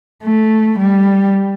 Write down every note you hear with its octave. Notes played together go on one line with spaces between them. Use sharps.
A3
G3